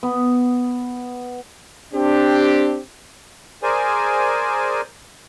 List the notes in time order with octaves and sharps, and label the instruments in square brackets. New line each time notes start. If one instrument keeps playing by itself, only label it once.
[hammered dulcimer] B3
[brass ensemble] C4 D4 G4
[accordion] G#4 A#4 C5 D5 G#5